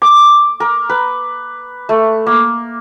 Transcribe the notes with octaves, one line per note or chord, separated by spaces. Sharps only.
D6
A#4
B4
A3
A#3